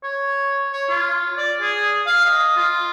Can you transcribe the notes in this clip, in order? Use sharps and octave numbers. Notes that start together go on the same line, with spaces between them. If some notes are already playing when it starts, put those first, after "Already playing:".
C#5
C#5
F4
D5
G#4
F5
D#5
F4